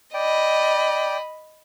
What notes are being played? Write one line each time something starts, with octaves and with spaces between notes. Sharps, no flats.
D5 D#5 G5 B5